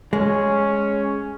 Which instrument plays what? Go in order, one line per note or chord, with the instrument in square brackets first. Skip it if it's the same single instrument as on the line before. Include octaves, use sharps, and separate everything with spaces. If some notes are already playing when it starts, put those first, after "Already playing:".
[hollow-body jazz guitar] G#3 [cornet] C#4